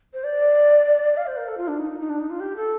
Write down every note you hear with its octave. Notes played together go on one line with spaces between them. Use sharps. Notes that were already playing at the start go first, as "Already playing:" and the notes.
C5
D5
F5
C5
A#4
A4
F4
D4
D#4
D#4
D4
D#4
F4
G4
A4